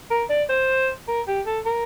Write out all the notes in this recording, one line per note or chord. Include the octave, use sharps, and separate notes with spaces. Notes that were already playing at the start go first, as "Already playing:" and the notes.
A#4
D5
C5
A#4
G4
A4
A#4